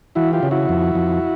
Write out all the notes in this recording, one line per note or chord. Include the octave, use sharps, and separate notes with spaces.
E3 E4 F#4
F4 G4
C#3
E4 F#4
F2
F2